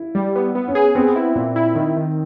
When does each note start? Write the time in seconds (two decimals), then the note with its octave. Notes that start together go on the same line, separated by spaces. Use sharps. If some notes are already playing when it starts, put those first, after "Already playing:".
Already playing: E4
0.15 G3
0.35 B3
0.55 B3
0.68 C#4
0.75 G#4
0.95 B3 C4
1.16 E4
1.35 A#2
1.56 E4
1.75 D#3
1.96 D#3